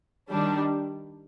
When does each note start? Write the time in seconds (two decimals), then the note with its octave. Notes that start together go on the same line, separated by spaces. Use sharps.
0.30 D#3 G3 D4